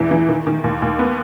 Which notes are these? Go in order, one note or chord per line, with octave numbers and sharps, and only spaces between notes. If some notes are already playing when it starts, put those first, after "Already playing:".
Already playing: E2 E3
E3
D#3
D#3
D#2
D#2
B3